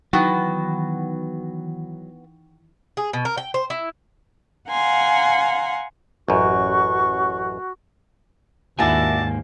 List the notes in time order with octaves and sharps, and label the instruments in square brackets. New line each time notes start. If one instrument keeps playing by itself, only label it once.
[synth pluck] D#3 E3 [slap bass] F#3 [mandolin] B3 F#4 [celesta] F#5 G5 C#6
[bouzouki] G#4
B2
A#4
G5
C5
E4
[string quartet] F5 F#5 G#5 A#5 C6
[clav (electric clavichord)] A1 F#2 [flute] F#4 [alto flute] C#6
[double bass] D#2 [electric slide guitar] G#2 A#3 G#5 [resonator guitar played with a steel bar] D4 E4 F#4 [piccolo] A5